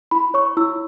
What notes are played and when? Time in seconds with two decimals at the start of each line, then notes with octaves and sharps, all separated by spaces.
0.11 E4 B5
0.34 C#5 C#6
0.57 E4 E6